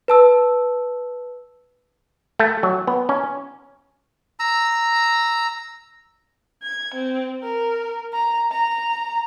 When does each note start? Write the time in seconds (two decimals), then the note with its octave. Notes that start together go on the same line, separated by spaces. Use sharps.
0.08 B4 A5 E6
2.39 A3
2.63 F#3
2.87 B3
3.09 C#4
4.39 A#5 E6
6.63 G#6
6.94 C4
7.43 A#4
8.13 A#5
8.51 A#5